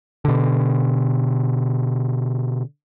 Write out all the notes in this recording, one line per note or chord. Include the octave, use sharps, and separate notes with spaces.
B2 D3